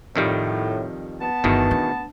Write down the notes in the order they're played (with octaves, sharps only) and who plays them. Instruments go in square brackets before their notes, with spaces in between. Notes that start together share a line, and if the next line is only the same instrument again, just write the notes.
[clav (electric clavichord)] F2 D#3 G3 [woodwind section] A2
[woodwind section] B3 A5
[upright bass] G1 [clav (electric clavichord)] E2 B2 D#3
[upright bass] D4